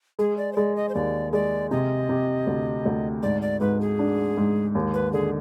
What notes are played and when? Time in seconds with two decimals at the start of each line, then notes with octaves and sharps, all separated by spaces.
0.19 G#3 G#4
0.38 D5
0.53 C5
0.56 G#3 D5
0.76 D#5
0.89 C5
0.95 D#2 D5
1.33 G#3 D5
1.71 C3 D#5
2.09 C3
2.47 D2
2.86 D2
3.23 G#2 D5
3.42 D5
3.61 G#2 B4
3.81 G#4
3.99 D4
4.37 G#2
4.75 D#2
4.94 B4
5.13 D3 G#4